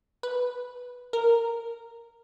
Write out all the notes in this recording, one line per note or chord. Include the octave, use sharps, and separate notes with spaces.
B4
A#4